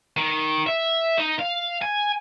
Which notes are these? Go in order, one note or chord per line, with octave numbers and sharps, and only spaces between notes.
D#3
E5
D#4
F5
G#5